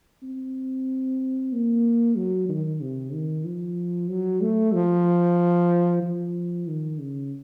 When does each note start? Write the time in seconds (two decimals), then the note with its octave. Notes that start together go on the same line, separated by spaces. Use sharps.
0.23 C4
1.52 A#3
2.16 F#3
2.49 D#3
2.81 C3
3.13 D#3
3.45 F3
4.10 F#3
4.41 A3
4.73 F3
6.02 F3
6.67 D#3
6.99 C#3